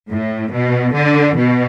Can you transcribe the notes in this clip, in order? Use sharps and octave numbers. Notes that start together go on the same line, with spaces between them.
A2
B2
D3
B2